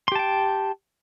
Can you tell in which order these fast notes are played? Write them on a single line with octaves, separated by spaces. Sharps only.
C6 G4 A5 G5